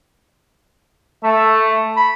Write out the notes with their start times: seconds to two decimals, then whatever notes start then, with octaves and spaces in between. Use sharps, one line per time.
1.24 A3 E5
1.97 B5